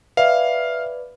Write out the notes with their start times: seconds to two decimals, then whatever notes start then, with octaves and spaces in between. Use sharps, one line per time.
0.17 B4 D5 E5 F5